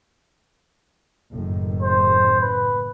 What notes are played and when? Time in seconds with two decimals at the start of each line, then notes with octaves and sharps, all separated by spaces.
1.31 F#1 A2 D#3
1.83 C5
2.41 B4